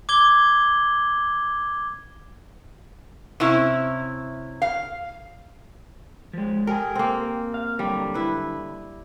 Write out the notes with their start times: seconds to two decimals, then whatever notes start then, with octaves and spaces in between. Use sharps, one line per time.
0.09 D6 G#6 G7
3.40 C3 C#4 E4
4.62 F5
6.34 F3 G#3
6.67 G4 A#4 G#5
6.95 A#3 C4
7.54 F5
7.79 D3 F#3 G3
8.14 E4 B4